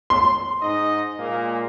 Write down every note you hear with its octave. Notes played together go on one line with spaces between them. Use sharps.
C6
G#2 D#4 D#5
A#2 G#3 A#3